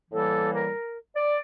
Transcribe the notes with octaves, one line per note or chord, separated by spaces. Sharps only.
A2 E3 G3 A#3 A4
A#4
D5